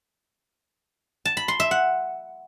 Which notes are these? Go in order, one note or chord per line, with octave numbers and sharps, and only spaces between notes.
A5
B5
C6
E5
F#5